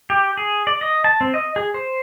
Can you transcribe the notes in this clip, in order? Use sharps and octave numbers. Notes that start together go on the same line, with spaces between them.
G4
G#4
D5
D#5
A5
C4
D#5
G#4
C5